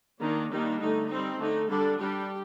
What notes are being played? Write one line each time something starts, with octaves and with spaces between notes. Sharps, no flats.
D#3 A#3 D4 D#4
D#3 G3 A#3 D4 D#4
D3 A3 D#4
G3 C4 D#4
D3 A3 D#4
D3 G3 D4 A4
G3 D4 G4